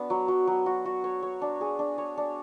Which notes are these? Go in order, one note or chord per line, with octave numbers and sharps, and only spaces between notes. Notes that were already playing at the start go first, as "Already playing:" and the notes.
Already playing: B3 D4 F#4
F#3
F#3
F#3
F#4
F#4
C#5
C#5
D4
G#4
D4
C#5
D4